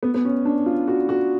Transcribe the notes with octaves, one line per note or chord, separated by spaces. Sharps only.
B3
B3
C#4
D4
F4
F#4
F#4